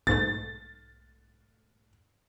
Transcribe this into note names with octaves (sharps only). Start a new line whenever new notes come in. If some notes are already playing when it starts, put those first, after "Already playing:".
B1 G#2 A3 A6